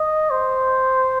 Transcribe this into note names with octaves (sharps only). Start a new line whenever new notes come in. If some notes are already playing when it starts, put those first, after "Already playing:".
Already playing: D#5
C5